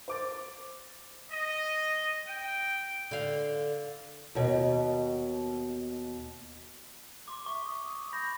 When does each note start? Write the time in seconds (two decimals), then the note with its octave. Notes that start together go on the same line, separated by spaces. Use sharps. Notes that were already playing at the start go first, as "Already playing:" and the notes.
0.08 C5 D6 A6
1.32 D#5
2.28 G5
3.11 D3 F5
4.35 D#2 B2
7.28 C6 D6
7.46 E5 C#6
7.66 D#6
8.13 B5 G6 A#6